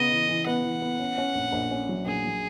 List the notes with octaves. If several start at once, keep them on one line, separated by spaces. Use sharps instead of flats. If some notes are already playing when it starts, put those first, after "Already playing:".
Already playing: C#3 B3 D#5
E3
E3
B3 F#5
E3
B3
C#4
C#4
A#1
A#1
C#4
F#3
A#1 G#4
F#3